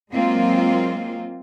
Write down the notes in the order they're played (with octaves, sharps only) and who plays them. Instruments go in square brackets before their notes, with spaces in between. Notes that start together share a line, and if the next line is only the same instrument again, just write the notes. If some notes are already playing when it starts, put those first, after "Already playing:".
[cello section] F#3 G#3 A#3 C4 F4